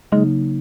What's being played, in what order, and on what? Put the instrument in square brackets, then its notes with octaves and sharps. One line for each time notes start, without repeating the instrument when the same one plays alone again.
[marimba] C#3 F#3 A#3 D#4 [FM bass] G#3